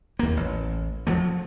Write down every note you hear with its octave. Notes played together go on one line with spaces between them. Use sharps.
D#2 A#3
A1
F3 F#3 A3